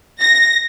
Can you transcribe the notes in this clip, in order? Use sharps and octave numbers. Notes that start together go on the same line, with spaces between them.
A#6